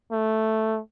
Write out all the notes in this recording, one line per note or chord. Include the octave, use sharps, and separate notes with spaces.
A3